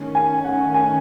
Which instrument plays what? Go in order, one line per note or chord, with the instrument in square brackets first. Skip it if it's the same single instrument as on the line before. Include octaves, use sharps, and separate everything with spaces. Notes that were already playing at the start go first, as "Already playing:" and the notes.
Already playing: [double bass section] D#3 A3 C#4
[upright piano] G#5
F#5
G#5